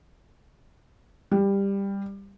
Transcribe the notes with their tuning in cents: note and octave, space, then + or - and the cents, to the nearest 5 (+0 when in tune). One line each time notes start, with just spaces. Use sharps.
G3 +15